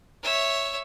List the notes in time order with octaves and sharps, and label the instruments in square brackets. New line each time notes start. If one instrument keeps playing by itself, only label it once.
[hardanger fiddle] C#5 E5